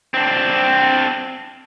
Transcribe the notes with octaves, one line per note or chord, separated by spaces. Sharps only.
C4 D4